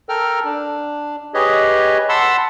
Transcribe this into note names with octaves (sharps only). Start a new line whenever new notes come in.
A4 A#4 G5 F6
D4
G4 G#4 B4 C#5 D#5
F#5 A5 B5 C6 E6